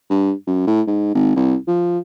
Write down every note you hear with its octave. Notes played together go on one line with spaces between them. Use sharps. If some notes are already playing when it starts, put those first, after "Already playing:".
G2
F#2
A2
G#2
G#1
C2
F3